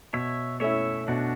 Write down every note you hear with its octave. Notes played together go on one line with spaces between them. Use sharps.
B2 C#5 E5
A3 C#4 E4 C#5 E5
B2 D4 F#4